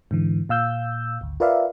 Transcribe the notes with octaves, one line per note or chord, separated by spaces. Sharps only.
G#2 D3 E3
A#2 F5 E6 G6
G#1 D2
F4 A#4 B4 D5 E5 F5